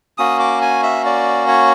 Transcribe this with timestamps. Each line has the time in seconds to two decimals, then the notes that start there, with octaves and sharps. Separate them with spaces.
0.18 A#3 C#4 F#4 D#6
0.40 D6
0.62 G#5
0.83 E5
1.05 D5
1.48 C#5